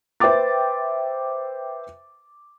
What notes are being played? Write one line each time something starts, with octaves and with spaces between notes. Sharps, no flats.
B4 C5 E5 G5 D6 A6